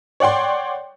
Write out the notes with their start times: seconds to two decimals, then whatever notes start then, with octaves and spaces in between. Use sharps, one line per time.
0.20 C#5 D5 F#5 G5 C6